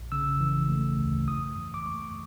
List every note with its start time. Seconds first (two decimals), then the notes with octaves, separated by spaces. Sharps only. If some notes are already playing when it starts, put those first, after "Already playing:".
Already playing: A#1
0.12 C#3 E6
0.40 E3
0.69 A3
0.98 D2
1.27 G2 D#6
1.57 E3
1.74 D6
1.85 A3 C#6